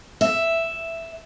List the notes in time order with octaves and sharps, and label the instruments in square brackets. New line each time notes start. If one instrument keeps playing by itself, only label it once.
[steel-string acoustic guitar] E5